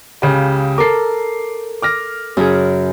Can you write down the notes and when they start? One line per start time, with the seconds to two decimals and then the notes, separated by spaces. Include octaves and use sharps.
0.22 C#2 C#3 G4
0.78 A4 A#4 D6 C7
1.82 D6 F6 A#6
2.37 F#2 C#3 G#4